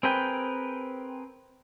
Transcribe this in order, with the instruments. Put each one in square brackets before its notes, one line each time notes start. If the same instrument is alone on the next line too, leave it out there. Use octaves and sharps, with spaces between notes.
[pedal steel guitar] C4 G#4 A#4 B4 G5